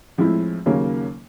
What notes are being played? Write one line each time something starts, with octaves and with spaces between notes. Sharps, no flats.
A2 F3 G#3 C4 E4
D#2 C#3 F#3 A#3 C#4